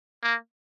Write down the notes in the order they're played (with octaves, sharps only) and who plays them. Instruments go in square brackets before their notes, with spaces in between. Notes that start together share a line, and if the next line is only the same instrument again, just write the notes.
[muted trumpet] A#3